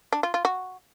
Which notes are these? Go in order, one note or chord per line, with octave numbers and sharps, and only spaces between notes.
D4
F4
F4
F#4